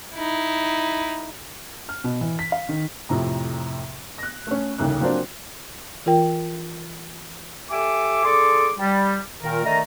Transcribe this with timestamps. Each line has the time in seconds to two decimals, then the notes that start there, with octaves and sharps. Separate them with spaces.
0.15 D#4 E4
1.89 F6
2.04 B2
2.21 E3
2.39 B6
2.52 F5
2.69 D#3
3.09 F2 A2 C3 A#5
4.18 F#6 A#6
4.47 A3 C#4
4.78 D#1 C2 C#3 D#4 F#6
5.00 F3 F#3 A#3 C4 D4
6.06 E3 F4 A#4 G5
7.70 G4 A4 E5 G#5 D6
8.24 D3 G#4 A4 C6 D6
8.79 G3
9.42 A#2 D#3 A#4
9.64 D3 D#3 A3 D#5 A#5